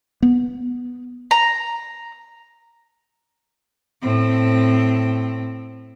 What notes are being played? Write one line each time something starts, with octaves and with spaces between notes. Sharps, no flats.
B3
A#5
A2 C4